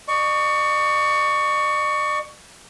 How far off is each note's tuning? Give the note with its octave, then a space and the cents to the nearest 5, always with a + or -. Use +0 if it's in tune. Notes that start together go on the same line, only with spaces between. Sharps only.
D5 +45 C#6 +15